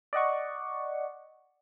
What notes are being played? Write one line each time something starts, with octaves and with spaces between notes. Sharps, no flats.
D5 D#5 F#5 C#6